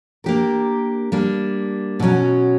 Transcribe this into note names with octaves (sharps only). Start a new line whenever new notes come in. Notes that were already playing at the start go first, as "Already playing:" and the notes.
A#3 D4 G4 A#4
G3 A#3 D4
B2 F#3 C#4